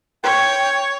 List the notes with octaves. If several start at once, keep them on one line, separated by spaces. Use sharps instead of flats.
C#5 G5